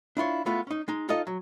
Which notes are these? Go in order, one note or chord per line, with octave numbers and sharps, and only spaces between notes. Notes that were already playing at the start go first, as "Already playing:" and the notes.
D4 E4 F4 C#5
G#3 A3 B3 E4 F4
C#4 D#4
G#3 D#4
D#4 F4 A4 D#5
F#3